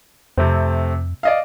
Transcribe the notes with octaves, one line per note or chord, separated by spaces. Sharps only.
F2 C3 A3 C4
D5 D#5 F5